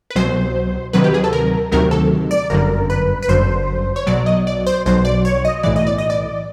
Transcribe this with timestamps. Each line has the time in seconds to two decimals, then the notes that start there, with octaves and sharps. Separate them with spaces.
0.10 B4
0.16 C2 B2 F#3 C5
0.93 D2 C3 D#3 F#3 B4
1.04 G4
1.14 G#4
1.24 A4
1.33 A#4
1.72 D2 C3 D#3 F#3 A#4
1.91 A4
2.31 D5
2.50 G1 F#2 D3 A#4
2.90 B4
3.22 B4
3.28 G1 F#2 D3 C5
3.96 C#5
4.07 B1 B2 F#3 D5
4.26 D#5
4.47 D5
4.67 C5
4.86 B1 B2 F#3 C5
5.05 D5
5.25 C#5
5.45 D#5
5.63 B1 A2 E3 D5
5.76 D#5
5.87 D5
5.98 D#5
6.10 D5